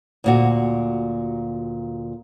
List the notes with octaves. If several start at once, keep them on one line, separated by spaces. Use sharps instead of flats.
D2 A#2 F#4